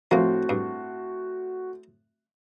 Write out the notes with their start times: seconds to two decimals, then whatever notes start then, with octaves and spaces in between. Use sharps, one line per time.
0.11 A2 F3 A#3 C4 F#4
0.49 G2